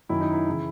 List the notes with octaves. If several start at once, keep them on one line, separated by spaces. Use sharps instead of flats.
F#2 D#3 E4
D#4
E4
C#3 E3